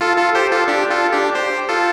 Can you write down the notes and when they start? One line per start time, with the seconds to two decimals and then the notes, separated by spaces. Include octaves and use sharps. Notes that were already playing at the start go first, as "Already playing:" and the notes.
0.01 F4 A4
0.17 F4 A4
0.35 G4 C5
0.52 F4 A4
0.68 D4 G4
0.90 F4 A4
1.13 D4 G4
1.35 G4 C5
1.69 F4 A4